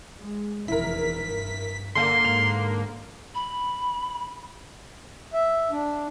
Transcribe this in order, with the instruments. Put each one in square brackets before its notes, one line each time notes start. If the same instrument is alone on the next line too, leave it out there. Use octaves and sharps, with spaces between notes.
[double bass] G#3
[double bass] F1 E2 [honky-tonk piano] E4 A#4 [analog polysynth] B6
[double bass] G2
[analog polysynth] D3 A#3 [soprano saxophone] C6
[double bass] G#2 [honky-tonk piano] F7
[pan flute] B5
[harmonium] E5
D4